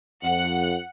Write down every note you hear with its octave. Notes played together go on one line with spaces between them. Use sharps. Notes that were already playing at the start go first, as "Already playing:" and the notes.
F2 F#5